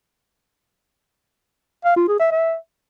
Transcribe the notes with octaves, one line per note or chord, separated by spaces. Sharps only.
F5
F4
G#4
E5
E5